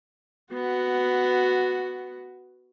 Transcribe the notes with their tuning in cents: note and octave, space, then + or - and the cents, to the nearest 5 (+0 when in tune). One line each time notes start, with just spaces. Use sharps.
B3 +10 F#4 +0